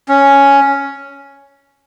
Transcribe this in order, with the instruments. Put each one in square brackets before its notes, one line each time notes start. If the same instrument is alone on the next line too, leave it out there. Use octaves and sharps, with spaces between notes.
[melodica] C#4